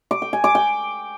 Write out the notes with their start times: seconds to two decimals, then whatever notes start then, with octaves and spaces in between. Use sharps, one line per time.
0.11 D6
0.22 G5
0.33 G#5
0.44 D6
0.55 G5